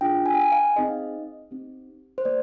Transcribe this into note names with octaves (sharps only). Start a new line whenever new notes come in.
D4 F4 G#4 G5
G#5
G5
G#5
F5
C4 D#4 G#4 D#5
C4 D#4 G4
C5
A#3 D5